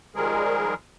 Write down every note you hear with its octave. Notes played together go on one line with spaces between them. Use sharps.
D#3 F3 G3 G#3 G#4 A#4